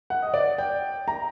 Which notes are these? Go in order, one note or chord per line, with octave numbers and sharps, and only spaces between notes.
F#5
D#5
D5
G5
A#5